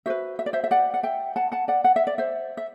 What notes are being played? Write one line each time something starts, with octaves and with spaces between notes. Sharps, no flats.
F#4 B4 C5 E5
E5
D5
C5 E5
E5
D5 F#5
F#5
E5 G5
F#5 A5
F#5 A5
D5 F#5
F#5
E5
D5
C5 E5
E5